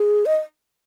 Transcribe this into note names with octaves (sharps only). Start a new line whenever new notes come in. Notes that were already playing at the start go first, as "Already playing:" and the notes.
Already playing: G#4
D#5